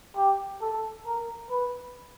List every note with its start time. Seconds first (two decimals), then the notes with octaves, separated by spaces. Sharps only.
0.16 G4
0.61 A4
1.06 A#4
1.50 B4